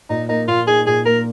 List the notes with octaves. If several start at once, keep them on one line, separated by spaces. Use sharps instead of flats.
A#2 D#4
A#3 D#4
A#2 F4
D#4 G#4
A#2 G#4
A#3 A#4